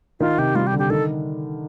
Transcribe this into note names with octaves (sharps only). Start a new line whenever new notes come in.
D#3 F4
C3 G4
G3 F4
G4
D3
G4
D#3 A4